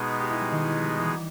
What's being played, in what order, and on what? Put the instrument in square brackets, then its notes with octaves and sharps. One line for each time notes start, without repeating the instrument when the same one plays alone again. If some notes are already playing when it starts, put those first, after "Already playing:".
Already playing: [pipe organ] B2 G#3 B3 D#4 G#4
[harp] G4
E4
G3
D#3
G3
E3